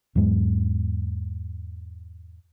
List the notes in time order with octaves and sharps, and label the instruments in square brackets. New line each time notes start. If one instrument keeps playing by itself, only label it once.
[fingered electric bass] E2 G#2 F#3 G#3